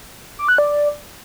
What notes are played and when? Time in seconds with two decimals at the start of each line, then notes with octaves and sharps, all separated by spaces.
0.39 D6
0.49 F#6
0.58 D5